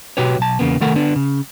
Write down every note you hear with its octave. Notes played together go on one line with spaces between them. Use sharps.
B2 F#4 G4 B4 C#5
B1 A5
E2 C#3 A#3 B3
C2 D#3 A3 A4 A#4 F#5
D3 B3 D4
C#3